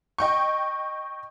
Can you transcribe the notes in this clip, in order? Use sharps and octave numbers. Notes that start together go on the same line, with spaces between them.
D#5 G5 C#6